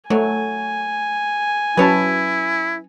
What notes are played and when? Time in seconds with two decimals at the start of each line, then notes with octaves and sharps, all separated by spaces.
0.10 F#3 A3 G#5
1.77 F#3 C#4 E4 B4 C#5 A5